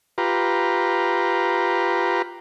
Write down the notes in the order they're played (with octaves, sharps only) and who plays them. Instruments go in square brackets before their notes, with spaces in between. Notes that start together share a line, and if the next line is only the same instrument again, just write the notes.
[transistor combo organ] F4 G4 B4 A#5